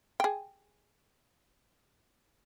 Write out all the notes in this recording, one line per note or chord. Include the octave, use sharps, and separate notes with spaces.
G#4 G5